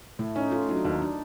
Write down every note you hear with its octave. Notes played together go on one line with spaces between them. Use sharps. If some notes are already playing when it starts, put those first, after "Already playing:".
A2 A3
C#4 D#4
A3 F4
F#3 D#4
D4
D#2 D#4
D4